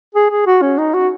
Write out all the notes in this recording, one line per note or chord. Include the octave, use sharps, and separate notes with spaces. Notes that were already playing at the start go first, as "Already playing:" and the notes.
G#4
G#4
F#4
C#4
D#4
F#4